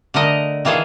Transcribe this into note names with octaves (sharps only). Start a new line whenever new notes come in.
D3 A3 A#4 D#5
D#3 E3 F4 G#4 A4